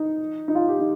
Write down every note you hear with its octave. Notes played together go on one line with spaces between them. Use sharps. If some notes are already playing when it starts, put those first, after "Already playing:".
Already playing: D#4
D#4
F4
G4
D#4